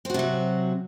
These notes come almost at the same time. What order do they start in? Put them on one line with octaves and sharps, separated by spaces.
C4 F#4 C3 F#3